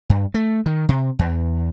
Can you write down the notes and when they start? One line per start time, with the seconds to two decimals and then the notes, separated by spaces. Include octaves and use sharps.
0.10 G2
0.34 A3
0.66 D#3
0.89 C3
1.19 E2